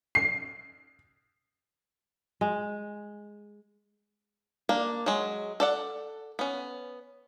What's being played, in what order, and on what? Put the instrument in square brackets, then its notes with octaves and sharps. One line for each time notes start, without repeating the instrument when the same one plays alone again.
[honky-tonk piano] C7
[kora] G#3
[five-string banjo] A#3 D4
F#3 G#3
A4 D5 F#5
B3 C#4